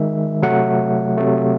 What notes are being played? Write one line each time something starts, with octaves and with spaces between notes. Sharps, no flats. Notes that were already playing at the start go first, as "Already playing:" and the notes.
Already playing: D#3 G#3 E5
C3 F#3 A3 F#5
C3 F#3 A3